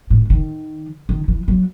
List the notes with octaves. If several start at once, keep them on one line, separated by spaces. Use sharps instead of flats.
A2
D#3
D#3
E3
F#3